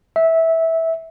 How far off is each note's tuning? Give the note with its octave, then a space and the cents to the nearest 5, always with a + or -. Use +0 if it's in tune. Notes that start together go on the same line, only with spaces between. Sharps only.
E5 -15